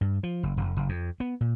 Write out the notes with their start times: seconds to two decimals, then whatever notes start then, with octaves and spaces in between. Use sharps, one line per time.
0.01 G2
0.23 F3
0.43 F#1
0.57 F1
0.77 F#1
0.89 F2
1.20 B3
1.41 A#2